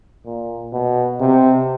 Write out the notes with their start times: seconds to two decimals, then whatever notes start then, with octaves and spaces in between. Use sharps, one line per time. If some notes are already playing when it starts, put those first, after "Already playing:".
0.26 A#2
0.72 B2
1.20 C3